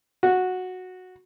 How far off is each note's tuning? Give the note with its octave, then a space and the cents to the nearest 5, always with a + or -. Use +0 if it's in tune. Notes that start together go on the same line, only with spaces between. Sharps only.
F#4 -10